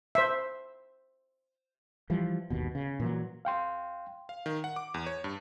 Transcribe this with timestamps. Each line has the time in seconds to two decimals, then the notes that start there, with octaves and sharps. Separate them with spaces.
0.15 C5 E5
2.10 E3 F3 G3
2.50 G1 D#2 B2
2.75 C#3
3.00 A#2 E3 F#3
3.45 F5 G5 C6
4.29 F5
4.46 D#3
4.64 F#5
4.76 D6
4.94 E2
5.06 C#5
5.24 G2